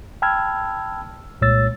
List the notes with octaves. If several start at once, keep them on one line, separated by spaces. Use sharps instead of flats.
G5 A5 B5 E6 F6 G#6
C2 A#2 G#3 C#5 E6 A6